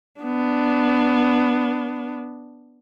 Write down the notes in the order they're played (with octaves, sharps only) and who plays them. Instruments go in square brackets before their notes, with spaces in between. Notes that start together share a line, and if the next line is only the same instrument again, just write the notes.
[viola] B3 D4